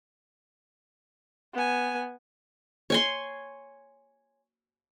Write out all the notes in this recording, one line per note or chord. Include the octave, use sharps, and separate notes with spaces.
B3 G#5
C#5 G#5 C6